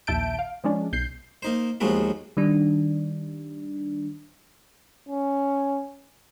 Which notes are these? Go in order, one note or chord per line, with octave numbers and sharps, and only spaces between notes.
A#1 D#2 E5 A5 G6 D7
F5
F3 G#3 C#4 D4
B1 G6 C7
A#3 D#4 C5
D#2 F3 F#3 G#3 B3 F#4
D#3 G3 D4
C#4